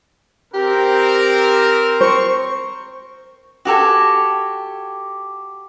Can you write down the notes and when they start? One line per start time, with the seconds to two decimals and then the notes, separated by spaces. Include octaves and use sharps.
0.54 C4 G4 A#4
2.01 C5 C#6
3.65 F#4 G4 A4 G#5